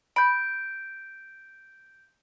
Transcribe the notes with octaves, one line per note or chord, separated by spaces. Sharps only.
B5 G6 D7